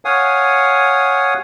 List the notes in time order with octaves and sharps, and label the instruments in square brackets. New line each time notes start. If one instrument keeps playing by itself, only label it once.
[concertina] C#5 F5 F#5 G#5 D#6